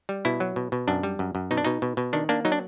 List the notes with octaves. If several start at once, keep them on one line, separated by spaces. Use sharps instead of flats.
G3
B2 E4
F#3
B2
B2
F#2 D4
G3
F#2
F#2
B2 D#4
D4
B2 D#4
B2
B2
D#3 D4
A#3 D4
F#3 D#4
D4